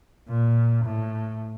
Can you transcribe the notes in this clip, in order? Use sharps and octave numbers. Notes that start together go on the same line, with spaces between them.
A#2
A2